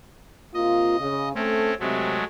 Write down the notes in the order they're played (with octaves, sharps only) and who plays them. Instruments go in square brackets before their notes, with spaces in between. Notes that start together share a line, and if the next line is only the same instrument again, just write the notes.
[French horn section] C3 A#3 F4 [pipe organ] D#5
[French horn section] C#3
[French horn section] A3 [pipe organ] C4 C#4
[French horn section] C3 [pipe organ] F#3 G#3 A3